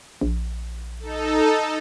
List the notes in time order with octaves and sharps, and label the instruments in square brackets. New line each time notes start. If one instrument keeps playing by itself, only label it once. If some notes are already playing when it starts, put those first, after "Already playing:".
[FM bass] A#1
[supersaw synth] D#4 A4